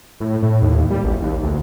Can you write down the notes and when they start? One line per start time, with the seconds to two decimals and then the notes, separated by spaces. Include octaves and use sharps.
0.20 A2
0.43 A2
0.62 D#2
0.90 G3
1.04 A1
1.22 D#2
1.42 D2